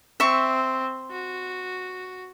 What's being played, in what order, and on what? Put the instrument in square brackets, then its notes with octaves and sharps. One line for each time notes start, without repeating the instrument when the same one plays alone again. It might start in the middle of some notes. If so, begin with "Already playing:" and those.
[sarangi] C4 [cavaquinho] E5 C#6
[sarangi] F#4